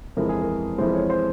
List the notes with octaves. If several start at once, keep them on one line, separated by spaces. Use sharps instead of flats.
F2 E3 G#3 A#4
G#4
A#4
F2 E3 G#3 C5
C#5
C5